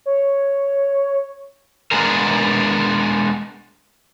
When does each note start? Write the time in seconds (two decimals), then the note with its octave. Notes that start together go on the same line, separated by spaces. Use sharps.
0.06 C#5
1.91 G#3 B3 D4 G#4 A#4